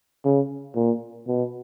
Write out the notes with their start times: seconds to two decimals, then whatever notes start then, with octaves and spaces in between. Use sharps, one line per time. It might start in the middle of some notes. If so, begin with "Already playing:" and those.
0.25 C#3
0.76 A#2
1.28 B2